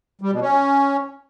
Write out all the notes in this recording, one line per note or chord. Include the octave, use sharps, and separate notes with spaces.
G3
B2
C#4